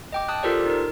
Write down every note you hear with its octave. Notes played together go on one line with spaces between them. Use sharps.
D#5 G5 D6
A5 D#6 F#6
F4 G4 A4 A#4 C5 D5
D#4 A#4